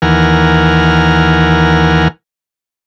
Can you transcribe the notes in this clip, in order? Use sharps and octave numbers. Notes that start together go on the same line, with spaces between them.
D#2 E3 A#4 F#5 G#5 F6